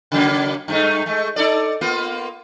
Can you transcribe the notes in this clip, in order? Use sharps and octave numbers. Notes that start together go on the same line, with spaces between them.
C#3 F#3 A#3
G2 A3 D#4
G#3 A3
D#4 A4 D5
A#3 B3 F4